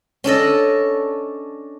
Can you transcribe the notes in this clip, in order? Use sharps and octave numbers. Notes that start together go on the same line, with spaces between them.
C#4 D4 A4 D#5